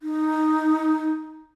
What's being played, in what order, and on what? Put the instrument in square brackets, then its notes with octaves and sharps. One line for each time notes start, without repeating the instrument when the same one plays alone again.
[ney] D#4